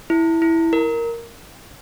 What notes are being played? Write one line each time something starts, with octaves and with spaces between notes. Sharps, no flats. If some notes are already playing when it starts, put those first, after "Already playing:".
E4
E4
A#4